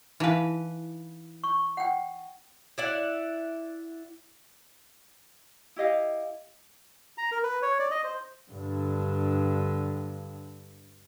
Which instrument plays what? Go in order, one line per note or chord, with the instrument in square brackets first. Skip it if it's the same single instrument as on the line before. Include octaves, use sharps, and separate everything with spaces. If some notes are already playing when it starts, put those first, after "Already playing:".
[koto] E3 B4 [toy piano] D#4 E4 F5
[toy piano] C#6
F#5 G5
[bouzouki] E4 D5 F#5
[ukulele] E4 G4 D#5 F5
[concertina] A#5
A#4
B4
C#5
D5
D#5
C5
[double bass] G2 D3